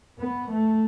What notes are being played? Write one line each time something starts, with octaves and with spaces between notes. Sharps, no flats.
B3
A3